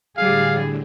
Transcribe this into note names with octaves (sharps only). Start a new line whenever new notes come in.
A2 D3 G3 G#4 F5